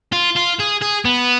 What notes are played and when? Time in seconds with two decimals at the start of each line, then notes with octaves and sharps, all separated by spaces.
0.12 F4
0.36 F4
0.59 G#4
0.82 G#4
1.05 B3